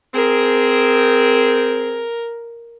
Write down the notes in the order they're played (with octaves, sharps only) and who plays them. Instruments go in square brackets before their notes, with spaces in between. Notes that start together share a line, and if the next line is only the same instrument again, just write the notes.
[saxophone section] C4 G#4 [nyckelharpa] A#4